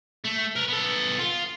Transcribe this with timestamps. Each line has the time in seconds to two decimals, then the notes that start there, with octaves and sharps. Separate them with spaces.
0.24 A3
0.56 A#4 B4
0.68 B3 A4
1.19 F4